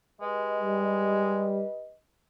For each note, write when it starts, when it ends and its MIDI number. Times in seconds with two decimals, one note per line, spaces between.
0.21 1.49 56
0.21 1.95 67
0.21 1.95 71
0.21 1.95 75
0.62 1.63 55